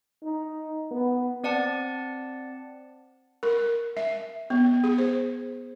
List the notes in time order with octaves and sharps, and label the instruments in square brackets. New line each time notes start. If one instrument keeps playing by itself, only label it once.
[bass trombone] D#4
B3
[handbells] C4 D5 F#5 A5
[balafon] A#4
E5
B3
G#4
C5